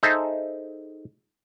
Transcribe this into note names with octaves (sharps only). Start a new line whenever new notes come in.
D#4 G#4 A4 C5 E5